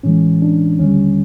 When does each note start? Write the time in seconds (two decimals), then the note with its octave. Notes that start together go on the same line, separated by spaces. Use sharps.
0.03 A2 E3 G#3 C#4
0.42 D4
0.79 D#2 D3 G3 C#4